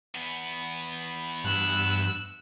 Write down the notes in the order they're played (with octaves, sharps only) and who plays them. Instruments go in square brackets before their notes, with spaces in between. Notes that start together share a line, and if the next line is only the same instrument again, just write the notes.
[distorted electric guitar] E2 B3
[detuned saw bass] G2 [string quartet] E6 F#6